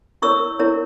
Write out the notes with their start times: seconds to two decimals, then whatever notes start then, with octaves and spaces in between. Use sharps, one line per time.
0.22 E4 A#4 C#5 C#6 E6
0.59 E4 A#4 C#5